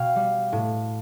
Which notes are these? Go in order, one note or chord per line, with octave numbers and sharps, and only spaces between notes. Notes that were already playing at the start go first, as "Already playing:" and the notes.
Already playing: B2 F5 G5
G3
A2